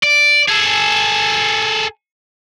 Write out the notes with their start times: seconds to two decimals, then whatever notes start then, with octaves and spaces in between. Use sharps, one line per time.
0.03 D5
0.49 G#4 A4